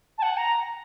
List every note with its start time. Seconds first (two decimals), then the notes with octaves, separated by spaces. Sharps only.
0.18 A5
0.22 F#5
0.37 A#5